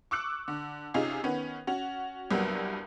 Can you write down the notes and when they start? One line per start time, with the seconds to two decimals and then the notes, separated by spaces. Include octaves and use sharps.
0.11 C#6 D6 E6 F#6 C#7
0.48 D3
0.94 C3 C#4 D#4 F4 G#4
1.24 D#3 B3 C#4
1.67 C#4 F#4
2.31 C2 G2 F#3 G3 A#3 B3